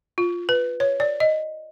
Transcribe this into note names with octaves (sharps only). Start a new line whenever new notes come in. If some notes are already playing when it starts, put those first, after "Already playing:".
F4
B4
C#5
D5
D#5